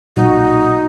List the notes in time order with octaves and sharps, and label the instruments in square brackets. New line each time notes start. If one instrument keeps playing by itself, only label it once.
[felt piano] B1 A#2 [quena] D#4 [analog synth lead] F#4